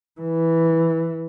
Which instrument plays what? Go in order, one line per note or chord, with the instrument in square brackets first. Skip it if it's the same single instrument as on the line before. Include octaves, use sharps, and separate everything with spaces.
[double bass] E3